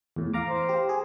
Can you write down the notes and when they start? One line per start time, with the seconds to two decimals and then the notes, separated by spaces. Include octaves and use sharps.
0.16 E2 A2
0.34 F5 A#5 D6
0.47 C5
0.69 G4
0.89 G#4